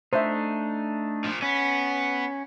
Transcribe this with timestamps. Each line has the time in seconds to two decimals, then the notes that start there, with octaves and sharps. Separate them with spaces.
0.13 A3 D4 D#4 C5 E5
1.24 A#2 F3
1.42 B3 C#4